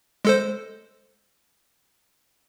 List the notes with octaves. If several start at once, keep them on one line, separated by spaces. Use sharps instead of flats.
G#3 A4 C5